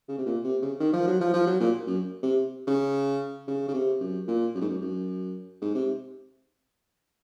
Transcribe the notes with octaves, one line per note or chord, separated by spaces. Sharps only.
C#3
C3
A#2
C3
C#3
D#3
F3
F#3
F3
F3
F#3
A#2
F#2
C3
C#3
C#3
C#3
C3
F#2
A#2
F#2
G#2
F#2
F#2
G#2
C3